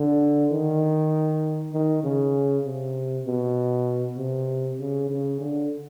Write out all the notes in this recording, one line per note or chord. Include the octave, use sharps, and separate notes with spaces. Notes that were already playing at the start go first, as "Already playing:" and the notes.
Already playing: D3
D#3
D#3
C#3
C3
B2
C3
C#3
C#3
D3